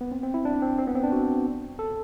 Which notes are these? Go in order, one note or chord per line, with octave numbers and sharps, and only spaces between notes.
B3
C4
C4
E4
D4
C4
C4
B3
C4
D4
F#4
A4